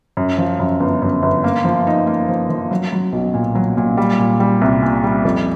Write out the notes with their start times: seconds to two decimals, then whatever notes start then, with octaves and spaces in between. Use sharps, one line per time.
0.17 F#2
0.38 F3
0.59 F#2
0.80 G1
1.02 F#2
1.22 G1
1.44 A#3
1.65 F3
1.87 D#4
2.07 A#3
2.28 F3
2.50 F3
2.71 F#3
2.92 F#3
3.13 B1
3.34 A#2
3.55 F#3
3.77 A#2
3.97 G3
4.19 A#2
4.40 G3
4.61 C2
4.83 A#2
5.04 G3
5.25 F2